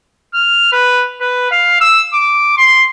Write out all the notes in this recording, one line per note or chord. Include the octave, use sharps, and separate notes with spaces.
F6
B4
B4
F5
E6
D6
C6